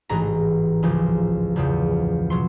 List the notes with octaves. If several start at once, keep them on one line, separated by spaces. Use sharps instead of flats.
A1 G#2 E3 A#5
C#2 C#3 F3
E2 C#3 F3
B2 F#3 C6